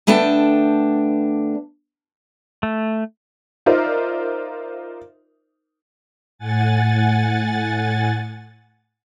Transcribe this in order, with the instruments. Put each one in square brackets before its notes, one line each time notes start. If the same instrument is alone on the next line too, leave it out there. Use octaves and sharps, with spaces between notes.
[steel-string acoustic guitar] D3 A3 B3 D4 G5 A5
[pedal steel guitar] A3
[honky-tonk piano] D#4 F4 A#4 C5 D5 E5
[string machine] A2 F#5 G#5 A6